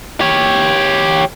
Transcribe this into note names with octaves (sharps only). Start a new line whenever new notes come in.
G4 C#5